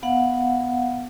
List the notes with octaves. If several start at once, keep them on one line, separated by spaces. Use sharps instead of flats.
B3 F5 F#5